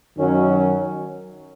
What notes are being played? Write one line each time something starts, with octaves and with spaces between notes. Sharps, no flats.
F#2 D#3 F#3 C#4